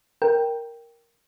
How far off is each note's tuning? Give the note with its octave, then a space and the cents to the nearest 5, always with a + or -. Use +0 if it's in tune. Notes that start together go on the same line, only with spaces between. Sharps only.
A#4 +0 G5 +0